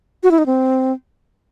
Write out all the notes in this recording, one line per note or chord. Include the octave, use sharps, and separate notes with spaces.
F#4
E4
D#4
C4